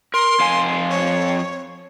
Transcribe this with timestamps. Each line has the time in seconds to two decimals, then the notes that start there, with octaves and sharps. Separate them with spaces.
0.14 A#4 C6
0.40 F2 F5 G#5
0.90 C#5